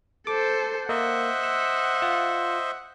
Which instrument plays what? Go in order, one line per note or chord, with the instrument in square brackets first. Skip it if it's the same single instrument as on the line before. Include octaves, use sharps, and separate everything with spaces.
[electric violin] A4 C5 [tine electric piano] D6
[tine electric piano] A#3 [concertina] C5 D#5 E5 [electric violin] F#5
[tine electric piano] E6
F4